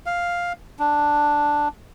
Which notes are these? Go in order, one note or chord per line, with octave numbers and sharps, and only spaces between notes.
F5
D4